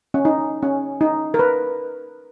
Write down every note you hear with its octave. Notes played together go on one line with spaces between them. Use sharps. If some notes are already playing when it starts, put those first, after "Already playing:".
C#4
D#4
C#4
D#4
A#4
B4